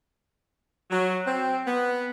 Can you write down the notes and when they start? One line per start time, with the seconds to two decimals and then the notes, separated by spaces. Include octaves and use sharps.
0.91 F#3
1.26 C4
1.66 B3